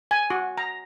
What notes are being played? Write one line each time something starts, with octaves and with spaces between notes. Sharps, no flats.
G#5
F#4
A#5